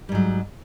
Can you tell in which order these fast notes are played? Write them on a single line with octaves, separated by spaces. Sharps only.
G3 G#2 F#3